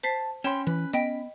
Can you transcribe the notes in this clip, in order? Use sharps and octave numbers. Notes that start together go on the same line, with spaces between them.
C5 A5 B6 C7
C#4 G5 B5 C6 E7
E3 B4
B3 D#5 G5 B5 D7